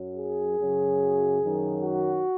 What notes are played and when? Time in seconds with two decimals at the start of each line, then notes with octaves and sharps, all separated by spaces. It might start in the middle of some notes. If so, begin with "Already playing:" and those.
Already playing: F#2 F#3
0.17 G#4
0.59 F#2 C#3 F#3
1.42 F#2 D#3 F#3
1.83 F#4